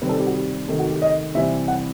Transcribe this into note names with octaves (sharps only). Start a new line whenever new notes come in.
C3 D#3 G3 C4 B4
A4
G4
F#4
G4
C3 D#3 A3 A4
F#4
G4
D#5
C3 E3 G3 C4 E5
F#5